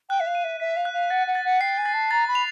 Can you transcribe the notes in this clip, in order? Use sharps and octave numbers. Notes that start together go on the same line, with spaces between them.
G5 F#6
E5
F5
D#7
E5
E5 B6
F5
F#6
F5
F#5 A6
F#5
A6
F#5
G5 C7
G#5
A6
A5
A#5 A6
B5
F7